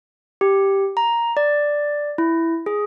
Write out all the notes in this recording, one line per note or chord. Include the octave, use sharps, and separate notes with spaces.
G4
A#5
D5
E4
G#4